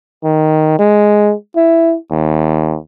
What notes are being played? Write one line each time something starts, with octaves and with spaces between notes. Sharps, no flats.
D#3
G#3
E4
D#2